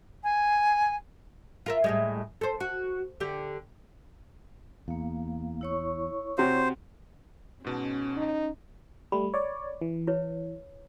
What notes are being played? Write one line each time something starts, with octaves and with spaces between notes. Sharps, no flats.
G#5
F4 A#4 E5
A2 G3 G#3
A4 C5
F#4
D3 G4
E2 A#3 F5
E4 C#5 C#6
C3 F#4 C5
G#2 B2 C#4 A5
D#4
G3 A3 B5
C#5 D5
E3
E4 B4 C#5